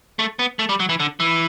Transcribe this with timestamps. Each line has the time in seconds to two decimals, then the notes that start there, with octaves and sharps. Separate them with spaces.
0.19 A3
0.39 B3
0.59 A3
0.69 G3
0.80 F#3
0.89 E3
1.00 D3
1.20 E3